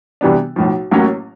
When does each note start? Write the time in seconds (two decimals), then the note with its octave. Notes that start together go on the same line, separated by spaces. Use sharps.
0.21 C3 E3 G3 B3 D4
0.56 B1 A2 F3
0.91 A1 A2 F#3 A#3 C#4